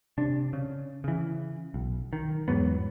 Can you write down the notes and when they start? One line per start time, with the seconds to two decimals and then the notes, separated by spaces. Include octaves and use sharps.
0.18 C3 D4
0.53 C#3
1.04 C#3 E3
1.74 B1
2.13 D#3
2.48 E2 G#2 F#3 B3